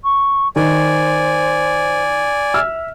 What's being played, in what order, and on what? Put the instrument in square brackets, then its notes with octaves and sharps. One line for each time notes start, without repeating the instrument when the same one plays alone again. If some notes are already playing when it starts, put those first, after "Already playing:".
[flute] C#6
[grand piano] D#3 [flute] C5 [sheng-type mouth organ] D5 G#5
[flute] E5 [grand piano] E6 F6